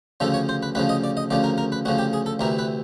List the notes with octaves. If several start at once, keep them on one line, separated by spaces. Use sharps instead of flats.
D2 C#3 F3 A4
C#5
C5
B4
D2 C#3 F3 B4
D#5
D5
D#5
D2 C#3 F3 D5
A#4
A#4
B4
D2 C#3 F3 F#4
G4
G#4
A4
D2 C3 E3 A#4
B4